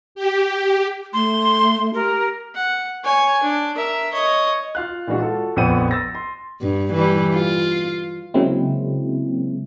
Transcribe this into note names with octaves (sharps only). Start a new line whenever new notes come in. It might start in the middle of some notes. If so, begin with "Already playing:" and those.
G4
A3 C6
G4 A#4
F#5
C#5 G#5
D4
A#4 E5
C#5 D#5
F4 F5 F#6
A#2 E3 G#3 D4 F#4
F4 F#4 A4
A#1 F2 B3 C4 F#5 D#7
E6 A6 A#6
C6
G2
E3 G3
F4
C#3 F#3 G#3 A#3 C4 E4